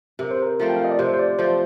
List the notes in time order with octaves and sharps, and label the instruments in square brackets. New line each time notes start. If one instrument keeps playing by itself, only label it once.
[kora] C3 [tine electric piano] A#4
[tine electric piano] C5
A#4
[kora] F3 A3 C4
[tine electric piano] G5
F5
D#5
D5
[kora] C3 [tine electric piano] C5
[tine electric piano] C5
D5
[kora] F3 A3 C4 [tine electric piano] C5